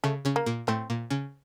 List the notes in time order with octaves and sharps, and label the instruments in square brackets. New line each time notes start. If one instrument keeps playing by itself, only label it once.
[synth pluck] C#3 C#4 [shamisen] A3
[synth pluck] C#3 C#4
[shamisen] A#3
[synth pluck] A#2 A#3
[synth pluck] A2 A3 [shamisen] C4
[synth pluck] A#2 A#3
C#3 C#4